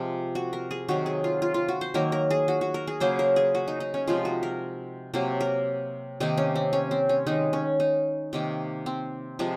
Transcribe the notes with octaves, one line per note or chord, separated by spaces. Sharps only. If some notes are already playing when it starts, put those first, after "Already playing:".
Already playing: C3 F3 G#3
F#4
A#4
G#4
C3 D#3 F#3 F#4
G#4
F4
F4
F4
F#4
C5
D#3 F#3 A#3 A#4
A#4
G#4
F#4
F#4
A#4
G#4
C#3 F#3 A#3 C5
A#4
G#4
F#4
D#4
D#4
C#4
C3 F3 G#3 F4
F#4
A#4
C3 F#3 A#3 C5
A#4
C3 D#3 A#3 D#4
C#4
C4
C#4
C4
C#4
D#3 G#3 D#4
C#4
D#4
C3 D#3 A#3
C4
C3 F3 G#3